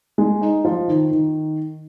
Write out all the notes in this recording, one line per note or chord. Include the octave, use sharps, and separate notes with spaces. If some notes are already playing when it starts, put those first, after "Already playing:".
G#3
D#4
F3
D#3
D#3